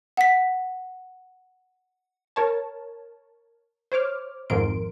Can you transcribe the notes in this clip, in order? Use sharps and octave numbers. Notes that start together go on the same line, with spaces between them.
F#5 B6
A#4 C#5 A5
C5 C#5 D6 F6
G#1 F2 G#2 A#4 C6 D7